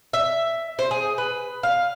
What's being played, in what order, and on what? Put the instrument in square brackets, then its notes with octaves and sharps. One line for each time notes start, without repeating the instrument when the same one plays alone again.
[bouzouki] E5
C5
G#4
B4
F5